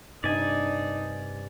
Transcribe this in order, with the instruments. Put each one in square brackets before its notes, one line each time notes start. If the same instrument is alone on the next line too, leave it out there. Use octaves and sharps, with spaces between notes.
[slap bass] G2 C3 [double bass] D4 D#4 [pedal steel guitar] D5 G#5